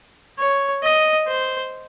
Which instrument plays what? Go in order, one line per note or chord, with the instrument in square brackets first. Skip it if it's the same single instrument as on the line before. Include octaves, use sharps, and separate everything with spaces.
[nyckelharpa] C#5
D#5
C5